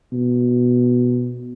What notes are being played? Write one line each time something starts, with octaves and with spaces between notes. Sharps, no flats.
B2